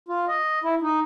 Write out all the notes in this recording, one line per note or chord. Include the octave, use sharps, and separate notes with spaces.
F4
D#5
E4
D#4